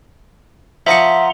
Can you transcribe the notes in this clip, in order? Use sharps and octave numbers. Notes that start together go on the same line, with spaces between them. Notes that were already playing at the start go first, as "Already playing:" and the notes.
F3 D#5 E5 F#5 A#5 C6 C#6